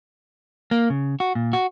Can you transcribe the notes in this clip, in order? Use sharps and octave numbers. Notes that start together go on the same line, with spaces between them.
A#3
C#3
F#4
A#2
F#4